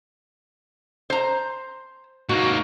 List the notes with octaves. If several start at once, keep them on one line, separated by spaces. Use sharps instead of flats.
C5 A#5
G#2 A#3 F#4